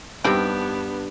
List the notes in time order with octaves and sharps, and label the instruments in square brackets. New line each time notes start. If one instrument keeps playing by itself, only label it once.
[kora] G2 G5 [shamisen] G3 C4 D#4 [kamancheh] B3 D4